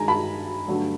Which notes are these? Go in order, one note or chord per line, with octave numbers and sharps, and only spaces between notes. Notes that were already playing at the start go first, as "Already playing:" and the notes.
Already playing: G2 D#3 G#3 G#5 A#5
A5 B5
G2 D3 F#3 A3